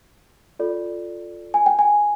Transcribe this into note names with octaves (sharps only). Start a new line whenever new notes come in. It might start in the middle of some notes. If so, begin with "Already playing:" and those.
F4 A4 D5
G#5
G5
G#5